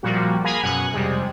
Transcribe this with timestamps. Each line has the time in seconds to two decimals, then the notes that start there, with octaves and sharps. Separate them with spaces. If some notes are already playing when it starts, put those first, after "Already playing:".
0.03 A#2 F3 G3 A#3 F#4
0.44 G#4 A#4 F5 G#5 B5
0.63 F#2 B2 F#5 G#5
0.93 F2 C3 G3 G#3